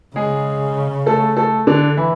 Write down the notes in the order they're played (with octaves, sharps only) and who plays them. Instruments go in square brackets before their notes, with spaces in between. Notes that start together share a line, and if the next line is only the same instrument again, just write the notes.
[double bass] C#3 [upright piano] G#3 G#4
[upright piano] A3 A4
A3 A4
D3 D4
E3 E4